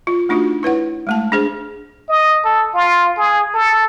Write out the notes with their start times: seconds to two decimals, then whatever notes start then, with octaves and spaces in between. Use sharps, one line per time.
0.07 F4
0.29 A3 D4 D#4 F4 F#4
0.63 E4 B4 C#5 F#5
1.07 G#3 A3 A5
1.32 D4 G#4 C5
2.09 D#5
2.45 A4
2.74 F4
3.17 G#4
3.54 A4